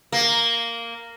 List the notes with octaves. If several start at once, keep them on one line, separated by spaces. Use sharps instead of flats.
A#3